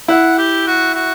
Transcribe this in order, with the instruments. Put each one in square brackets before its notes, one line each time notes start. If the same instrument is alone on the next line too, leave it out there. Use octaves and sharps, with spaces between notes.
[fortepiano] E4 [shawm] F#5
[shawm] G4
F#4
F#4